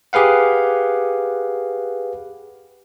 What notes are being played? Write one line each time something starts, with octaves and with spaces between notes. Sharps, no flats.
G4 G#4 B4 F5 F#5